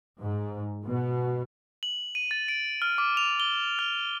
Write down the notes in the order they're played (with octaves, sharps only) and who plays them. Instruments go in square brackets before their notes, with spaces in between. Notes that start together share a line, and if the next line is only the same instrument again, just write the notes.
[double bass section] G#2
B2
[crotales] F#7
D#7
A6
D7
F6
D6
F7
G7
F6